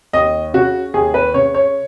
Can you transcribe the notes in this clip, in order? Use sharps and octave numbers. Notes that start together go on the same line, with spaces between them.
D#2 D#5
C#3 F#4
D#2 G#4
B4
C#3 C#5
C#5